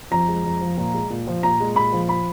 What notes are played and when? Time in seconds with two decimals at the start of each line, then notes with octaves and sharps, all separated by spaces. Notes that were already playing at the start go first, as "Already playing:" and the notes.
0.11 F2 A#5
0.28 G#3
0.45 F2
0.61 F3
0.77 A#2
0.94 G#3
1.10 A#2
1.27 F3
1.43 A#2 A#5
1.60 G#3
1.76 A#2 B5
1.92 F3
2.09 B5